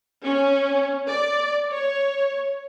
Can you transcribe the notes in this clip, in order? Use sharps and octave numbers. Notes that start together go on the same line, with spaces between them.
C#4
D5
C#5